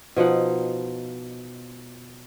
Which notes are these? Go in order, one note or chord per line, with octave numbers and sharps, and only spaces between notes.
B2 F3 D#4 F#5